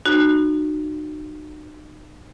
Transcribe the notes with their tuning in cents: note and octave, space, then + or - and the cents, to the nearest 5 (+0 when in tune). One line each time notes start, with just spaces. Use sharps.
D#4 -40 F#4 +0